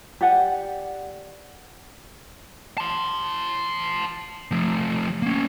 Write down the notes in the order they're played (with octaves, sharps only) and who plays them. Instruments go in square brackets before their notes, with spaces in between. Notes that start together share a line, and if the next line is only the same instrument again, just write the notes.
[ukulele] G4 D5 F#5 G#5
[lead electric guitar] A5 C6
F3 A3
A#3 C#4